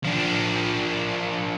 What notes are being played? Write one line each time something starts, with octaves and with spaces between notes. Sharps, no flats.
F3 D4